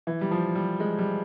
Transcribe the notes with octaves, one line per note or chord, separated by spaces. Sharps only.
E3
G3
F3
G3
G#3
G3